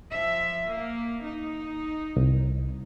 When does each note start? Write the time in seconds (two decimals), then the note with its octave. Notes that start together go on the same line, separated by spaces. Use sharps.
0.11 F3 E5
0.66 A#3
1.25 D#4
2.16 C2